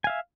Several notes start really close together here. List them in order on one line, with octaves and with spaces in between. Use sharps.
G#5 F5 E5